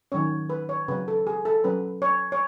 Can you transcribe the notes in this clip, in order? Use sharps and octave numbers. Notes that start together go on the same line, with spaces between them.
D#3 F#3 C#4 C#5
B4
C#5
C#3 F#3 C#4 B4
A4
G#4
A4
F#3 C#4 B4
C#5
C#5